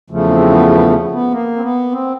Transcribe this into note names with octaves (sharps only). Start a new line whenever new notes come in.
E2 C#3 F3 A3
C4
B3
B3
B3
A#3
C4
B3
C4